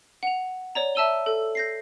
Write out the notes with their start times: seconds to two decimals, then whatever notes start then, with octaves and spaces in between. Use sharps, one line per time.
0.23 F#5 F7
0.75 C#5 D5 A#5
0.95 E5 A5 E6 D#7 G7
1.26 A4
1.55 G6 A#6 C7